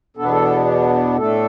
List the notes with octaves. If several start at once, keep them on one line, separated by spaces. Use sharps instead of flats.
E2 B2 B3 D4 A4
B4
A4
A2 A3 D4 A4